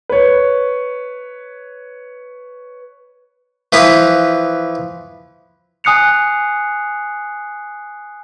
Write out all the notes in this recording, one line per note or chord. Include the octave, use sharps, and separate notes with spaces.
B4 C#5
E3 F3 B4 B5 D#6
G#5 D#6 F#6 C7 C#7 F7